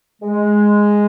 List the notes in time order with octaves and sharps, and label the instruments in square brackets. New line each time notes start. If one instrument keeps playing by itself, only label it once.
[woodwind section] G#3